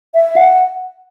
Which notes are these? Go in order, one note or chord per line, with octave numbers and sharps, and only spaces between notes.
E5
F#5